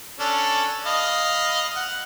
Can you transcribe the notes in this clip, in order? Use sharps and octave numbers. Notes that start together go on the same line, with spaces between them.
C#4 D4 A4
D#5 F5 B5
F#5